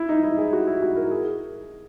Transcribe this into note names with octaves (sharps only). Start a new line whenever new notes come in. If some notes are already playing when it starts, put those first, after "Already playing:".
Already playing: E4
D#4
E4
G#4
F#4
E4
F#4
A#4
G#4